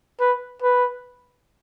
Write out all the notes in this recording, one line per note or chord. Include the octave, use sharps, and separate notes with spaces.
B4
B4